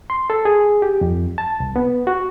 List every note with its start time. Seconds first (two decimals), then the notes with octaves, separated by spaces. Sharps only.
0.10 C6
0.30 A4
0.45 G#4
0.82 G4
1.01 F2
1.38 A5
1.60 C2
1.76 B3
2.07 F#4